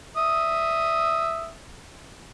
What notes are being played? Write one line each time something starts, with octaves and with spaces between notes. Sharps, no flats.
E5 D#6